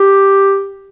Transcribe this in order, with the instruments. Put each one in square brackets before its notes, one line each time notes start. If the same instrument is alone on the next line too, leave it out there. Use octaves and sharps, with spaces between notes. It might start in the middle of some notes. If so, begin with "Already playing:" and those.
Already playing: [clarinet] G4